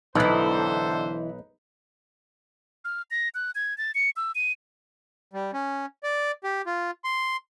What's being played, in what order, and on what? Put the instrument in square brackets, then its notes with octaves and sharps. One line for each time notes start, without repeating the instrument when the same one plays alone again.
[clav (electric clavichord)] B1 [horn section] D3 A4 C5 [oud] E3 E4 [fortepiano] D#4 B4
[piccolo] F6
A#6
F#6
G#6
A6
C#7
E6
D#7
[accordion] G3
C#4
D5
G4
F4
C6